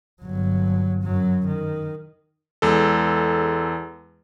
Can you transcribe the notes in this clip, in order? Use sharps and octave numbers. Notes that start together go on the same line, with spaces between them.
G1 F#3
F#2 F#3
D#3
E2 G#3 A4